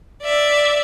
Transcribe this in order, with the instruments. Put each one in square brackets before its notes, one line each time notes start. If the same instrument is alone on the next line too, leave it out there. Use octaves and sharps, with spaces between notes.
[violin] D5 E5